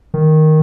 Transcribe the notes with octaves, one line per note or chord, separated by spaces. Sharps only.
D#3